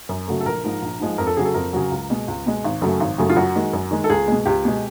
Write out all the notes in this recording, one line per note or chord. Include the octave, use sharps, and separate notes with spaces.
F#2
C#3 F#3 A3
A4
A#1 A#4
G#2 F3 G#3
A#1
G#2 F3 G#3
F2 A#4
A4
C#3 F#3 G#4
A4
F2 A#4
C#3 F#3
C#2
B2 G#3
C#2
B2 G#3
G#1
F#2 C#3 F#3 A3
G#1
F#2 C#3 F#3 A3
F4
F#2 F#4
D#3 G#3
F#2
D#3 G#3
A4
C#2 G#4
B2 G#3
C#2 G4
B2 G#3